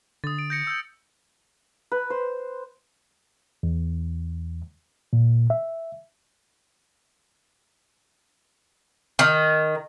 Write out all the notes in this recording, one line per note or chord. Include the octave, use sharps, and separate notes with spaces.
D3 D#6 A6
D7
G6 A#6 C#7
E6 G6
B4
C5
E2
A#2
E5
D#3